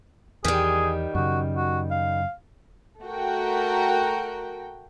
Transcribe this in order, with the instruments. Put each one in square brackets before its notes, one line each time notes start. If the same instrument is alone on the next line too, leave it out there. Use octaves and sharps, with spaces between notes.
[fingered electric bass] E2 [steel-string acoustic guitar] D#3 G3 [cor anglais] G#4
[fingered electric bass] F#2 C#3 [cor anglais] F#4
[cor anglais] F#4
F5
[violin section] A3 F#4 A#4 G5